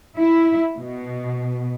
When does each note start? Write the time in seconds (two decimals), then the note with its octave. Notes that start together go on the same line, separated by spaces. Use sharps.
0.16 E4
0.77 B2